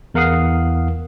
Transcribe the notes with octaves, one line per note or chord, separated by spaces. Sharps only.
E2 A#4 F5 F#5 D#6 C7